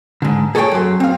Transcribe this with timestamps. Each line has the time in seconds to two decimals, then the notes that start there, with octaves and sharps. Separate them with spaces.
0.22 G#2 D3
0.55 G#4 A4 C#5 D5 G5 G#5
0.72 F#2 C6
1.00 C4 F5